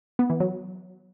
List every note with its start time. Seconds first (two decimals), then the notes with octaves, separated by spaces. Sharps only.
0.19 B3
0.30 E3
0.40 F#3